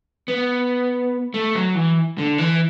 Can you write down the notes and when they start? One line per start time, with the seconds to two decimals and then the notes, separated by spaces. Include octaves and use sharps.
0.28 B3
1.34 A3
1.55 F#3
1.75 E3
2.18 D3
2.38 E3